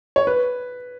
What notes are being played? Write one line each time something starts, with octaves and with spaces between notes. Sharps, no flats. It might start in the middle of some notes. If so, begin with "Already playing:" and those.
C#5
B4